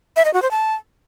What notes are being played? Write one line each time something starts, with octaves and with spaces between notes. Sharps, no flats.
E5
D#5
F#4
C5
A5